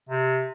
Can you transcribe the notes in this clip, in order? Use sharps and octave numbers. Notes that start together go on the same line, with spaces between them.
C3